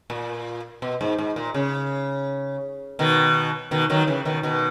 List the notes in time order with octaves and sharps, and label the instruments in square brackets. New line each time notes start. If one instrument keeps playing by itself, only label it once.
[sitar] A#2
B2
G#2
G#2
A#2
C#3
B2 D#3
B2 D#3
D#3 F#3
C#3 E3
B2 D#3
B2 D#3